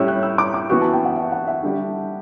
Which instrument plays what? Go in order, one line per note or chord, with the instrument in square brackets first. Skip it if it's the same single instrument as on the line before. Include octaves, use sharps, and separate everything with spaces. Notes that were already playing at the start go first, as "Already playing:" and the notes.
Already playing: [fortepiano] A2 G3 C#4 E4 [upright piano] E6
[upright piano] F#6
E6
D6
D6
[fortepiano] E3 B3 F#4 [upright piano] C#6
[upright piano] A5
G5
F#5
E5
F#5
E5
[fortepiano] D3 G3 D4 G4